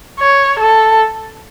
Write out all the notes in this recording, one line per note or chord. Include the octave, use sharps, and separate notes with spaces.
C#5
A4